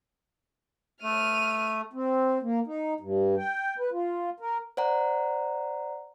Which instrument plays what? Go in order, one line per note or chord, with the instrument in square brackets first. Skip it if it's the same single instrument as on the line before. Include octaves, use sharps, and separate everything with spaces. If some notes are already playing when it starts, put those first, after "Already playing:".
[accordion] A3 [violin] F6 D#7
[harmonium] C4
A#3
D#4
G2
G5
B4
F4
A#4
[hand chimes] C5 D5 F#5 A#5